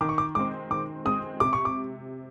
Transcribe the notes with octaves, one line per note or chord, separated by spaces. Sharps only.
D#3 D6
C#6
D6
G#3 C4 D6
D#3 D6
G#3 C4 D#6
C3 D6
C#6
D6